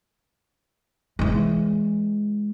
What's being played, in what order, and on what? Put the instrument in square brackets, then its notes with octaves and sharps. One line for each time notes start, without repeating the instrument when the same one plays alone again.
[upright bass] E3 G#3